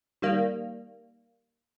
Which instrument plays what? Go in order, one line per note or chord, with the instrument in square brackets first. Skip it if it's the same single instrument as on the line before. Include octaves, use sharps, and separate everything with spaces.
[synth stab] D#3 G3 A#3